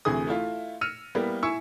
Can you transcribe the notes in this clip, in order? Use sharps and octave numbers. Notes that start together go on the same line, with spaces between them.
D2 C3 E3 G#4 D#6
A3 E4 F4
E6 F6 C#7 D#7 F7
G3 A#3 B3 E4
E4 G#5 C#6 E6 C#7